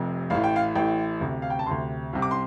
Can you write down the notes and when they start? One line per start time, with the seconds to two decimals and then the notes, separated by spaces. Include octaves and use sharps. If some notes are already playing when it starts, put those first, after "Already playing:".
Already playing: F1 F2 C3
0.30 A1 A2 F5
0.44 G5
0.56 F5
0.75 A1 A2 G5
1.21 D2 C3
1.42 F5
1.50 G5
1.59 A5
1.66 D2 C3 C6
2.13 C2 C3
2.22 D6
2.31 C6